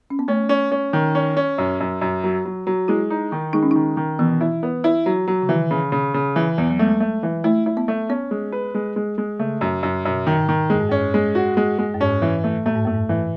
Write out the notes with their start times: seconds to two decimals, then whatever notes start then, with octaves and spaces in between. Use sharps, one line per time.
0.10 C#4
0.19 B3
0.28 A3 C#4
0.49 C#4
0.72 C#4
0.93 D#3
1.15 C#4
1.37 C#4
1.58 F#2
1.80 F#2
2.01 F#2
2.24 F#3
2.45 F#3
2.67 F#3
2.88 G#3 E4
3.10 D#4
3.32 D#3
3.53 G#3 D#4
3.63 C#4
3.71 D#3 D#4
3.97 D#3
4.19 B2 E3
4.41 E4
4.63 B3
4.84 E4
5.06 F#3
5.28 F#3
5.42 C#3
5.49 D#3 E3
5.71 C#3
5.92 C#3
6.14 C#3
6.36 E3
6.58 E2
6.71 F#3
6.79 G#3 A3
7.00 A3
7.23 E3
7.44 A3 E4
7.66 E4
7.77 B3
7.88 A3
8.09 B3 C#4
8.31 G#3
8.52 B4
8.75 G#3
8.96 G#3
9.18 G#3
9.39 C#3 A3
9.61 F#2
9.83 F#2
10.05 F#2 B2
10.27 D#3
10.37 G#2
10.49 D#3
10.70 F#2 G#3
10.79 G#2
10.89 F#2 C#4
11.14 G#3
11.35 F#4
11.57 G#3
11.79 G#3
11.94 F#2
12.00 G#2 C#4
12.22 E3
12.44 A3
12.66 A2 A3
12.75 G#2
12.85 F#2 A3
12.94 G#2
13.09 E3